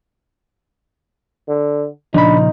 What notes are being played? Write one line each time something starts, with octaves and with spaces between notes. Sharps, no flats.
D3
A#2 C#3 F3 D4 D#4 B5